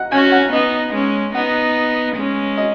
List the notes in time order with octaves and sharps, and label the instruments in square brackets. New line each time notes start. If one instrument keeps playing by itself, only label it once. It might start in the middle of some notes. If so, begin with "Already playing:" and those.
Already playing: [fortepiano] D#5 F#5
[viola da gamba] C#4 F#4 [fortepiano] G#5
[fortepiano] F#5
[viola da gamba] B3 D#4 [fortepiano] D#5
[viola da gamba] G#3 C#4
[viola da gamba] B3 D#4 [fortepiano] F#5
[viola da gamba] G#3 C#4
[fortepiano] D#5